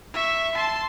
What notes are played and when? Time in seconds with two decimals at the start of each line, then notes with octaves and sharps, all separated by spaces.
0.13 E5 C#6
0.55 A5 C6